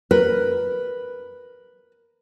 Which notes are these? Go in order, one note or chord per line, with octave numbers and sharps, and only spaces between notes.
A#4 B4